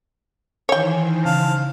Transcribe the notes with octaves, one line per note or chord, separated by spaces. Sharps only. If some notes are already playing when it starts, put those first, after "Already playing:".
D#3 E3 C5 C#5 G5 G#5
C#3 F5 A5